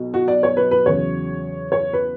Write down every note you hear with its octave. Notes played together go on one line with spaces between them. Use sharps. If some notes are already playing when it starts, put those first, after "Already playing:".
Already playing: B1 B2
F#4
D5
C#5
B4
B4
E2 C#3 F#3 C#5
C#5
B4